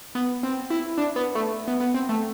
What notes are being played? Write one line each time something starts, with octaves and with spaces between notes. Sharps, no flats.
B3
C4
E4
D4
B3
A3
B3
B3
C4
A3